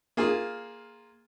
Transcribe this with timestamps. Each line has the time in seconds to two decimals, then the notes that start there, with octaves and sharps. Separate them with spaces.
0.17 A#3 F4 G#4